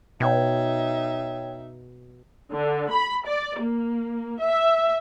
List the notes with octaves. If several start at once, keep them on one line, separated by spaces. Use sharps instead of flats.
B2 D#4 C#5 E5 G5 G#6
D3
B5
D5
A#3
E5